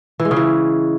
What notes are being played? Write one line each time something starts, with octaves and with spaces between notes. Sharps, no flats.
E3
G#3
C#3
E3